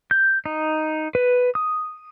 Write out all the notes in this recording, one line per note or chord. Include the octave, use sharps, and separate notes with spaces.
G6
D#4
B4
D#6